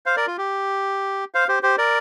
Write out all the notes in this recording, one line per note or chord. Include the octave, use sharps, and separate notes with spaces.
C5 F5
A#4 D5
F4
G4
C5 F5
G4 C5
G4 C5
A#4 D5